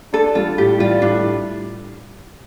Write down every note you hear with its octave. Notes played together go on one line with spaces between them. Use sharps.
D4 A4
G3 F4
A2 G4
G3 F4
A2 D4